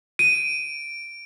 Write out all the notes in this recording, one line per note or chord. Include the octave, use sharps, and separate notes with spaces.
D7 D#7